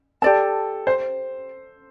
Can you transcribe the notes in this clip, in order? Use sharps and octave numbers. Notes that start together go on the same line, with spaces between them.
G4 A4 D5 A5
C5